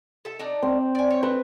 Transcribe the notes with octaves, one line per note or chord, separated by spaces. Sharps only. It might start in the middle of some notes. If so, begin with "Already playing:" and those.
A4 E5
D4 D#4 D5
C4
D5 G#5
C#5
C4 B4